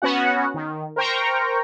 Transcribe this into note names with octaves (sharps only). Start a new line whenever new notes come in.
B3 C#4 F#4 F#5
D#3
A#4 C5 G5 A#5 C#6